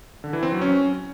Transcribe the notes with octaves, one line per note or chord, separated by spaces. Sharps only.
D3
E3
C4
F#3
C#4